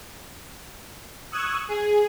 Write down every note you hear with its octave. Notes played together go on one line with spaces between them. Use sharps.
C#6 D#6 E6 F#6 G#6
G#4